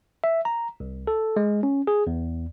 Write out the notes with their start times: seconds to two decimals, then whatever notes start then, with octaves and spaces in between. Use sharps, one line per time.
0.24 E5
0.45 A#5
0.80 C2
1.07 A4
1.36 G#3
1.63 C#4
1.87 G#4
2.07 E2